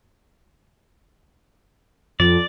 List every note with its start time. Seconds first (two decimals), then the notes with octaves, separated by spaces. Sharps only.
2.20 F2 D5